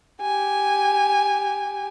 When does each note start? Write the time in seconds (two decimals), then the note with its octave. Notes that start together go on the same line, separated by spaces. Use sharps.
0.22 G4 G#5